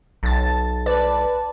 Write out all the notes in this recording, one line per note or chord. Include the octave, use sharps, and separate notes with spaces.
B1 A5 A6
B4 D5 A5